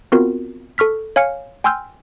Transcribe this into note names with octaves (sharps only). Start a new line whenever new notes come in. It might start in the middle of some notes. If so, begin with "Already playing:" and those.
B3 C4 F4 F#4 A#4
A4 C#6 F6 B6
C#5 F5 G#5 F6 C#7
G5 G#5 C6 E6 F6 G6